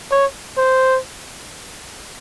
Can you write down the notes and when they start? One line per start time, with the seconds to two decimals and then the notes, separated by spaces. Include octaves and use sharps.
0.11 C#5
0.57 C5